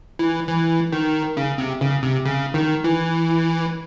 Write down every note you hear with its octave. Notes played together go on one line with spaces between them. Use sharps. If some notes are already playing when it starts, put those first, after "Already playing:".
E3
E3
D#3
C#3
C3
C#3
C3
C#3
D#3
E3